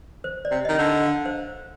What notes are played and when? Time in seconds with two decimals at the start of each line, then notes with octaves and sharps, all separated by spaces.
0.24 C5
0.45 D5
0.51 C3
0.65 D#3 D#5
0.78 D3
0.85 D#5
1.05 F5
1.26 C5